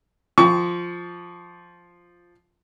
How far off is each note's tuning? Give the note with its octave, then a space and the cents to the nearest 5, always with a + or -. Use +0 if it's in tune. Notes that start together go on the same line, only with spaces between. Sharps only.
F3 +0 C#6 +30